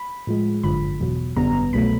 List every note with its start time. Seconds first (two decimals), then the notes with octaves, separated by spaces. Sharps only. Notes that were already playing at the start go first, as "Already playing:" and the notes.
Already playing: B5
0.27 A2 F3 G#3
0.63 G1 F#2 D3 F3 B5
1.01 E2 B2 F#3
1.36 G#1 F#2 D3 G3 B3 A#5
1.73 C2 B2 F#3 A3 B5